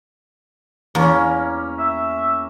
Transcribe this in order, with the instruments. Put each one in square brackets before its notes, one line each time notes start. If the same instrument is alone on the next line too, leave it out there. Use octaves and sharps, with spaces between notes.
[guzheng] E2 [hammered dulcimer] A#3 C#4
[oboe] E5